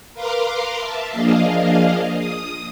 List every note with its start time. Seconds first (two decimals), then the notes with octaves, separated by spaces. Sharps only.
0.14 A#4 B4 F5 A#5 C6 D6
0.79 E5 A5
1.12 F3 A#3 D4 G#4 D#5 F5
2.18 D#6